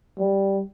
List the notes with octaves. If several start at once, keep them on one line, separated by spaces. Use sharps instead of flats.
G3